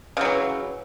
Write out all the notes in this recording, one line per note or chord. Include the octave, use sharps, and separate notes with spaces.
C#3 E3 F#3